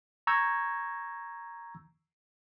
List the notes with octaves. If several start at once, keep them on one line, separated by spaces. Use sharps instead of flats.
A#5 C#6 E6 G6 G#6